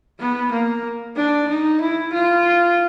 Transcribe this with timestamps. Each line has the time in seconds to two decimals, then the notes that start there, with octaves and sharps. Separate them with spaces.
0.19 B3
0.51 A#3
1.16 D4
1.49 D#4
1.81 E4
2.13 F4